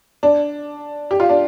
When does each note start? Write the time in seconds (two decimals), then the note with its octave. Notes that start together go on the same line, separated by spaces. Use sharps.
0.23 D4
1.11 G4
1.20 F4
1.29 D4